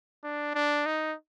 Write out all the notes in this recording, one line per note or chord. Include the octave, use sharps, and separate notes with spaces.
D4
D4
D#4